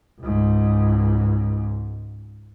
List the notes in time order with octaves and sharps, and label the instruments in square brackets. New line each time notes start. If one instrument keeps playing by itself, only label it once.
[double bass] C#2 G#2